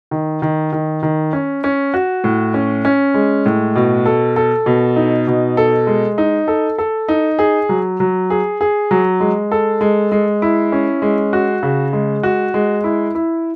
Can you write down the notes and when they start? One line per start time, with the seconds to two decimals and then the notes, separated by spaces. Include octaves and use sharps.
0.11 D#3
0.42 D#3
0.73 D#3
1.03 D#3
1.33 C#4
1.64 C#4
1.94 F#4
2.24 A2
2.54 C#4
2.85 C#4
3.14 G#3
3.46 A2
3.76 B2
4.06 A4
4.36 A4
4.66 B2
4.96 D#4
5.27 B2
5.57 A4
5.87 G#3
6.18 D#4
6.48 A4
6.78 A4
7.08 D#4
7.39 G#4
7.69 F#3
8.00 F#3
8.30 G#4
8.61 G#4
8.91 F#3
9.20 G#3
9.52 A4
9.81 G#3
10.12 G#3
10.42 E4
10.72 C#4
11.02 G#3
11.33 F#4
11.63 C#3
11.93 G#3
12.23 F#4
12.54 G#3
12.84 E4
13.15 E4